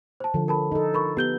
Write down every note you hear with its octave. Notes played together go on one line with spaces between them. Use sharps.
C5 A5
D3 F3
A#4 A5 B5
D#4 A4
A#4 B5 C#6
B3 G4 G6 G7